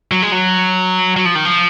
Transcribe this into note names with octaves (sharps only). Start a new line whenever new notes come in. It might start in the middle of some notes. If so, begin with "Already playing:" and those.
F#3
G#3
F#3
F#3
F3
D#3
F3